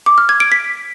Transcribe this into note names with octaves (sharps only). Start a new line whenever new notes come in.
D6
F6
G#6
D7
B6